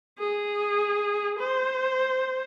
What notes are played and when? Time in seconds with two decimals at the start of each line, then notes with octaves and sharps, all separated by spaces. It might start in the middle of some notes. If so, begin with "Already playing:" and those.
0.19 G#4
1.40 C5